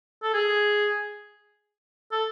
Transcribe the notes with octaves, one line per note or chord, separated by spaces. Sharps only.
A4
G#4
A4